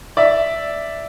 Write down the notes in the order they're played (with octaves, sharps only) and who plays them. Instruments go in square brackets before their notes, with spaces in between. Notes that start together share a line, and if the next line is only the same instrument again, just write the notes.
[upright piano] D5 E5